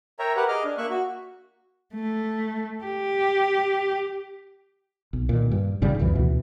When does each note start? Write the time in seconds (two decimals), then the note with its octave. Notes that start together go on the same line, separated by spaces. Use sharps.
0.19 A#4 C#5 E5 G5 A#5
0.36 G4 A#4 B4 F#5
0.48 G#4 D#5 D6 F6
0.64 D4
0.78 A#3 E5 C#6 F#6
0.90 F#4
1.94 A3
2.84 G4
5.13 B1
5.29 A#2 D#3
5.51 G2
5.82 A1 G#2 C#3 G3
5.99 C2 F2 E3
6.15 D2 B2 E3